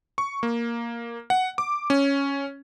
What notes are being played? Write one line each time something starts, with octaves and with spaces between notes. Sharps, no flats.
C#6
A#3
F#5
D6
C#4